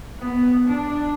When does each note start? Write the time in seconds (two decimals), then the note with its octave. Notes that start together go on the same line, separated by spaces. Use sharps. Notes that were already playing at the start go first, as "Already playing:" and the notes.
0.19 B3
0.67 D4